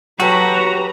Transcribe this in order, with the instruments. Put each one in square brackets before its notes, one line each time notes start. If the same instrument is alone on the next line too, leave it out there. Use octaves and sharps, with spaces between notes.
[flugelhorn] F#3 [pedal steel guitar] F#4 [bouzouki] G4 A4 [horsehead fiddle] B4 A#5